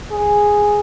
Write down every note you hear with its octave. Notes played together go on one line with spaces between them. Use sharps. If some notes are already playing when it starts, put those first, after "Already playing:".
G#4